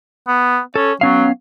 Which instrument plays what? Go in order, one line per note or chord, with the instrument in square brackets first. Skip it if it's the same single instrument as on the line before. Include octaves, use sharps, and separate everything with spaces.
[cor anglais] B3
[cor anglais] C#4 [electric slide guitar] A4
[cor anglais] F#3 [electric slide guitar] B3 C#4 F5